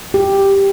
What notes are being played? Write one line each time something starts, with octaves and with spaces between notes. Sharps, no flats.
G4